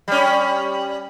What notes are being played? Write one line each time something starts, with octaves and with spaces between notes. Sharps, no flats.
G3 C#4